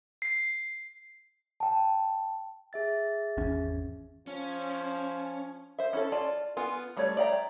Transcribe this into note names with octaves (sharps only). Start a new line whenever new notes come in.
C7
G5 A5
G#4 E5 A6
G#1 E2 C#4
F3 C#4
C5 E5
C#4 E4 F4 A4
F4 D5 A5
B3 F4 G#5
G3 A3 F#4 C#5 D5
D5 E5 G5 A#5